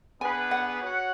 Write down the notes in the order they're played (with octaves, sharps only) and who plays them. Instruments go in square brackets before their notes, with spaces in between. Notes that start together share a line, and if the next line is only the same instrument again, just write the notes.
[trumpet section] B3 D4 G#4 B4 [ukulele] G#5
[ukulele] F#5
[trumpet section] F#4 C#5 F#5